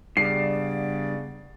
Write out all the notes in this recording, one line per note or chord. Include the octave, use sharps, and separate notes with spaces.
G2 C#3 B3 D5 C7